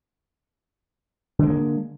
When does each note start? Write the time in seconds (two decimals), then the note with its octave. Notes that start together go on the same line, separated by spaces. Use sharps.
1.39 D3
1.43 C4
1.46 G#3
1.50 A#3